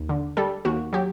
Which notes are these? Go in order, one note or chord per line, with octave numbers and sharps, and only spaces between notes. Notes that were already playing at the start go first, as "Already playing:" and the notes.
Already playing: D#2
D3
G3 A4
D#2 F#4
F#3 G4